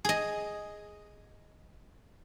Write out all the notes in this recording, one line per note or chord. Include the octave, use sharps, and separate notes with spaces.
G#4 D#5